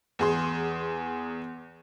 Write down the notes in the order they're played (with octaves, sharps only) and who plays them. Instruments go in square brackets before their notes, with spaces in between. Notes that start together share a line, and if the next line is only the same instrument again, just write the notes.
[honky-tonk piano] E2 G#4 C6